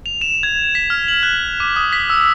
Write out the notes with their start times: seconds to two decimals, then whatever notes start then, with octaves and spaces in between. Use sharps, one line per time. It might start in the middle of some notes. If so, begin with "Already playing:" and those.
0.06 F7
0.21 E7
0.43 G#6
0.75 B6
0.90 F6
1.08 F#7
1.23 F#6
1.60 D6
1.76 D#6
1.93 B6
2.10 E6